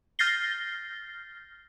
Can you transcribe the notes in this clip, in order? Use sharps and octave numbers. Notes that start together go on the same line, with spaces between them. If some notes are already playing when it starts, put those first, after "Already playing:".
F6 G6 A6 A#6 C7 G7